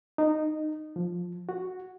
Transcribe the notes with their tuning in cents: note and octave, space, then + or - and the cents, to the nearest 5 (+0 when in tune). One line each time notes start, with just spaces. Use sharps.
D#4 -15
F3 +10
F#4 -5